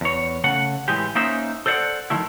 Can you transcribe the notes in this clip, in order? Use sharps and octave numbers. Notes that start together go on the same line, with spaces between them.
E2 C#5
C#3 A3 F#5
A2 E3 G#3 G4
A#3 C#4 D#4 C5 E5
A4 C5 D5 F5 F#5
D#3 F3 A3 E4